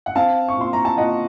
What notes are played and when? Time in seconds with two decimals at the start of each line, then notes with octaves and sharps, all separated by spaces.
0.06 F#5
0.15 C4 F5 A5
0.48 C#6
0.57 A#2 C6
0.73 A#5
0.85 A5
0.97 A#2 D#5 F#5